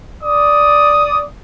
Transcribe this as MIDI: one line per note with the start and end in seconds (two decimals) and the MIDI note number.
0.23 1.24 74
0.23 1.24 87